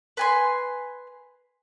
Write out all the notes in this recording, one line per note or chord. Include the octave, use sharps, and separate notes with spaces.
B4 G#5 C6